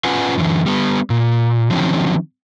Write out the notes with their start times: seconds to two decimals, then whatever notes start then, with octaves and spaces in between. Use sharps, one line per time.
0.05 C#4 F4 B4 F#5 G#5
0.37 F#2 D3 E3
0.66 G3 B3
1.10 A#2
1.71 D3 D#3 F3 F#3 C4 C#4